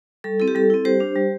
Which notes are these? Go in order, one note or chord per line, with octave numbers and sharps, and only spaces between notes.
G3 A4
C4 E4 A4
G4
G3 A4
C4 E4
G3 G4 C5
D4
G3